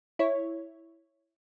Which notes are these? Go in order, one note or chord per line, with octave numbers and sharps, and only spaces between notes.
E4 C#5